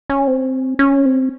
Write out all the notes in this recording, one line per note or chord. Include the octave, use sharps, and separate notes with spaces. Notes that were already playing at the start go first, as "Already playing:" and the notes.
C#4
C4
C#4
C4